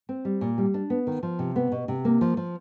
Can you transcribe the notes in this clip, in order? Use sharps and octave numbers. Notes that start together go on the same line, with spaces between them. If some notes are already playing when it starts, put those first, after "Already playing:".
C4
G3
A#2
G3
D4
B3
D#3
F3
C3
B3
B2
C3
A#3
F3
F3